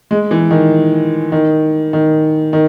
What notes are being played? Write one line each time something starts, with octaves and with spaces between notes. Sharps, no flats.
G#3
E3
D#3
D#3
D#3
D#3